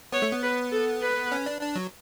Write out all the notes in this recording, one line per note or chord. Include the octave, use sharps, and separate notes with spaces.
B3 C#5
A3
B3
B4
A4
B4
C#4
D4
D4
F#3